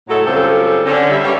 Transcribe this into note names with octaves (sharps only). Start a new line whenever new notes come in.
A2 F#3 G#3 A3 F#4 A4
F#2 C#3 G3 C4 F4 A4
D3 C#4
G3 E5
G2 G3 A#3 C#4 G4 C#5